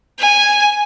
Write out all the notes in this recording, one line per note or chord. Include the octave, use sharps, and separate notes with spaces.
G#5